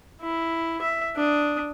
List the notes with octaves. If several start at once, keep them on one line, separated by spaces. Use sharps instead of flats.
E4
E5
D4 D#6